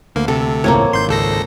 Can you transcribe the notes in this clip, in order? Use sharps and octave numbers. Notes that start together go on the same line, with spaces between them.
D2 A#3
C3 A4
E1 C#2 A2 A#3 C4 C#5
G#1 C6 G6
C#2 A4 A#6